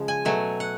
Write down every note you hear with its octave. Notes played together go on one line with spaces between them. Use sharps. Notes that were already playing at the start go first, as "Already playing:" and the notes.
Already playing: C#3 F3 G#3
G#5
B2 F#3 A3 G#5
F#5